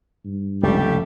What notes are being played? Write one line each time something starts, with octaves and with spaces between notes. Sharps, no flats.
G2
F1 C#2 G3 A3 G4